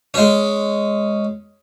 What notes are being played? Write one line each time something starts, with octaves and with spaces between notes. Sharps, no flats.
G#3 C#4